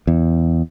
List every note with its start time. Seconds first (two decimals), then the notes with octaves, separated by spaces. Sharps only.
0.07 E2